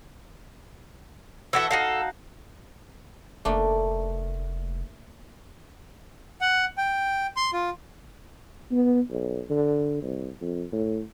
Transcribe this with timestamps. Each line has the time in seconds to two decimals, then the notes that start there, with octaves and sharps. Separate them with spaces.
1.53 E3 F#4 A4 E5
1.71 D#4 F#4 A4 F5
3.45 F1 A3 A#3 D4
6.41 F#5
6.78 G5
7.37 C6
7.53 F4
8.71 B3
9.10 B1
9.50 D3
10.02 C2
10.41 F2
10.72 A2